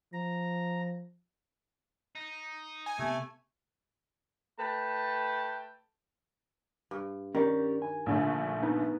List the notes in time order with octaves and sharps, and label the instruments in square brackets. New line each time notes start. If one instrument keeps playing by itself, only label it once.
[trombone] F3 [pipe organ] A#5
[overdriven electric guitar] D#4
[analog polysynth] G#5
[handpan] C3 B3 [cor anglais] A3
[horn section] A3 B4 G5 A5
[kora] G2
[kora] D#3 [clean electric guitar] C#4 G4 D5
[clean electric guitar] G#5
[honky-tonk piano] A#1 D3 A3
[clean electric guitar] B3 D#4 B4